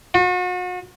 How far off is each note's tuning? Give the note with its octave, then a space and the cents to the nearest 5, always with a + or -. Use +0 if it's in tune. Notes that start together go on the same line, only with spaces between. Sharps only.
F#4 -40